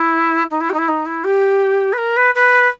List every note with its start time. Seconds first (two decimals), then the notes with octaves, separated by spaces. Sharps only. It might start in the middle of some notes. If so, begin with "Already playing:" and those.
Already playing: E4
0.51 D#4
0.61 E4
0.70 G4
0.74 D#4
0.78 E4
0.88 D#4
1.06 E4
1.24 G4
1.93 B4
1.98 A#4
2.17 B4
2.35 B4